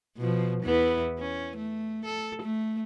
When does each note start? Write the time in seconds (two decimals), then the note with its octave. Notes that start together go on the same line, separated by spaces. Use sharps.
0.17 B2 F3
0.63 E2 B3 E4
1.19 C#4
1.57 A3
2.05 A4
2.42 A3